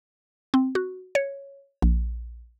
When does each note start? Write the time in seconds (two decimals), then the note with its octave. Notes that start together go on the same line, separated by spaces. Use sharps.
0.54 C4
0.75 F#4
1.15 C#5
1.82 A#1